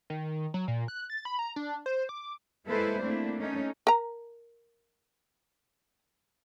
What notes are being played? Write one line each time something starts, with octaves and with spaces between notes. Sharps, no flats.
D#3
F#3
A#2
F#6
A6
B5
A#5
D4
C5
D6
G#3 A#3 E4 A4 B4 C5
A3 A#3 C4 D4 E4
A3 C#4 D#4
A#4 A#5